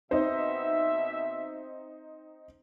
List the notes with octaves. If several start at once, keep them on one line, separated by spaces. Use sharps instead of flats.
B2 C4 D#4 C5 E5